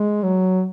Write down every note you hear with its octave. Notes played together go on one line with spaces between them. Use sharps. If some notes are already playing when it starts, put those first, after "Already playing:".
Already playing: G#3
F#3